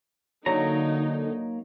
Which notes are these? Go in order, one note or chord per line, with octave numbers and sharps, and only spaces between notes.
D3 F#3 A#3 D#4 C#5 A#5